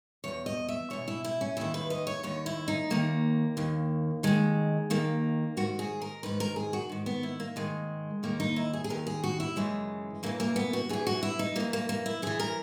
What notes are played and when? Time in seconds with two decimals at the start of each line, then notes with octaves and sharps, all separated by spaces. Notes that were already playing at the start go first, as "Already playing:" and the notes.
0.24 E2 B2 C#5
0.46 D#5
0.69 E5
0.90 E2 B2 C#5
1.08 E4
1.24 E4
1.41 C#4
1.57 D#2 D#3 E4
1.74 B4
1.90 D#5
2.07 C#5
2.23 D#2 D#3 C#5
2.46 E4
2.68 D#4
2.90 D#2 D#3 A#3
3.57 D#2 D#3
4.23 D#2 D#3 G#3
4.90 D#2 D#3 A#3
5.57 G#2 D#3 F#4
5.79 G#4
6.02 A#4
6.23 G#2 D#3 B4
6.40 A#4
6.56 G#4
6.73 F#4
6.89 G#2 D#3
7.06 B3
7.23 E4
7.40 A#3
7.56 G#2 D#3 G#3
8.23 D#2 D#3 A#3
8.40 D#4
8.56 E4
8.73 G#4
8.84 G#4
8.89 D#2 D#3 A#4
9.07 G#4
9.24 F#4
9.40 E4
9.56 F#2 C#3 E3 G#3
10.23 F#2 C#3 E3 A#3
10.40 A#3
10.56 B3
10.73 F#4
10.89 F#2 E3 G#4
11.07 F#4
11.23 E4
11.39 D#4
11.56 F#2 E3 A#3
11.73 A#3
11.89 A#3
12.06 E4
12.22 F#2 E3 G#4
12.40 A#4